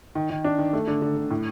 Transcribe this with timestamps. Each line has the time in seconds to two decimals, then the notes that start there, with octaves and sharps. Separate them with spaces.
0.15 D#3
0.30 D#3
0.44 D4
0.59 D#3
0.73 A3
0.87 D3
1.02 D3
1.16 D3
1.31 A2